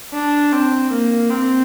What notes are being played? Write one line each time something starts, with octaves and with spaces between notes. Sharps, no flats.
D4
C4
A#3
C4